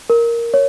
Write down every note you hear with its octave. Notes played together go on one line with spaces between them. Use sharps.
A#4
C#5